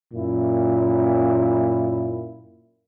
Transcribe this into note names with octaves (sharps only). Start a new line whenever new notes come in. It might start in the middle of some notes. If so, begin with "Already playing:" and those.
F#2 A#2 E4